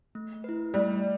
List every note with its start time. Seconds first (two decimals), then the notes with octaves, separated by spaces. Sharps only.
0.15 A3
0.44 E4 B4
0.74 G3 A3